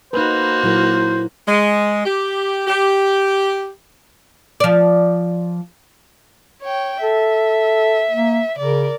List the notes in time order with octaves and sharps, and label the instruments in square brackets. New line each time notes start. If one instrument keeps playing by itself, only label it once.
[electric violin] A#3 F#4 [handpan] D#4 B4 [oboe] C5
[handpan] A#2 F#3 A#4 [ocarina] E4
[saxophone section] G#3
G4
G4
[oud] F3 D5
[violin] C#5 G5
[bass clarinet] A4 [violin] E5
[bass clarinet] A#3
[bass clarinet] C#3 [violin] A#4 D5